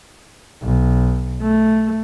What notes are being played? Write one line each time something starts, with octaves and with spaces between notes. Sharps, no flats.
B1
A3